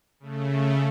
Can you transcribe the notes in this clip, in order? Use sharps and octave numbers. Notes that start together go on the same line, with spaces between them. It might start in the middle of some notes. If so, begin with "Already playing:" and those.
C#3 A3